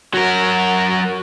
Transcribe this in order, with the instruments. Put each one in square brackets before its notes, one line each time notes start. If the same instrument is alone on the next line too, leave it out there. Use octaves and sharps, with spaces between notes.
[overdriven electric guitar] F#3 A#4 [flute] F#4